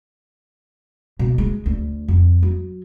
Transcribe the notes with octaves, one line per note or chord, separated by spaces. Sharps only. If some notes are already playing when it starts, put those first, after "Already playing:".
B2
G#3
D2
F2
F#3